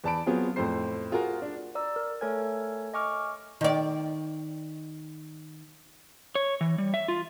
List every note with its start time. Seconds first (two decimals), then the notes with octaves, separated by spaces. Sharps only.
0.04 E2 D5 A5 B5 D7
0.26 F#3 B3 C4 F4 G#4
0.56 F2 A2 A3 C5 C7
1.12 F4 F#4 G#4 A#4
1.42 D4
1.75 D5 A#5 E6
1.96 A#4
2.21 A3 A4 A#4 C#5 G#5 G#6
2.94 D#5 G#5 C#6 D6 F6
3.61 D#3 D5
6.35 C#5
6.61 E3
6.78 G3
6.94 E5
7.08 F4